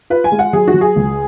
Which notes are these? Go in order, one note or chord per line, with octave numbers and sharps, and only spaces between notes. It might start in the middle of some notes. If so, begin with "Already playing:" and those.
F4 B4
G#5
G#3
F#5
F#3 G#4
F#4
F#3
G#4
C#2